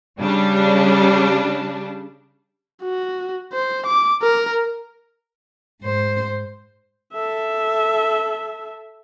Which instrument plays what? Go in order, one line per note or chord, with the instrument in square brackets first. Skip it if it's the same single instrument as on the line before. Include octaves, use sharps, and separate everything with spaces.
[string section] C#3 G3 D4
[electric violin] F#4
C5
D6
A#4
[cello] G#2 C5
[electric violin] A4 E5